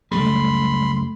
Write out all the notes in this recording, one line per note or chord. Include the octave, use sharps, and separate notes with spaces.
C#2 F#2 G3 A3 B5 C6